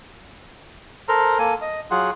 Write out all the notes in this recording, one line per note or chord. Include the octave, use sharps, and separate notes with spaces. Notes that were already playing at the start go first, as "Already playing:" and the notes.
A4 A#4 C5 A#5
A#3 A4 G#5
D#5
F#3 F4 G#4 F#5